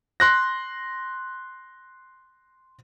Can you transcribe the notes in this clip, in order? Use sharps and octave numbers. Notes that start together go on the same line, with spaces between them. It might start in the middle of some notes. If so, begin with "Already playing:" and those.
C6 F#6 A#6